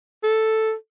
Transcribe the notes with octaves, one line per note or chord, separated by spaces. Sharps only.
A4